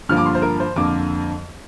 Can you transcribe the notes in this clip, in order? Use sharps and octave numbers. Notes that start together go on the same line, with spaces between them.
G2 D3 F3 A#3 F6
D6
C6
C5
A#4
C5
F2 D3 A#3 D6